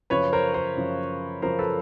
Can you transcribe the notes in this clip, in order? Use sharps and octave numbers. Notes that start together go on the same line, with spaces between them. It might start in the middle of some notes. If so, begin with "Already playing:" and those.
F#2 C#3 F3 B4 C#5
A#4 C5
A#4 C5
F#2 C#3 F3
F#2 C#3 F3 A#4 C5
A4 B4